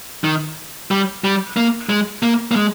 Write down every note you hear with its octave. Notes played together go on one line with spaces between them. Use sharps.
D#3
G3
G3
A#3
G#3
A#3
A#3
G#3